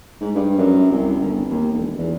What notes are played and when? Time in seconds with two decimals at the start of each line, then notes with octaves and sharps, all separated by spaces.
0.21 G#2
0.35 G2
0.58 F#2
0.91 C2
1.20 G1
1.50 D#2
1.73 E1
1.98 E2